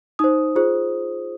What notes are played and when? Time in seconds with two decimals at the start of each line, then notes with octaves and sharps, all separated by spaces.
0.19 D#4 C5 D#6
0.56 F4 G#4 C5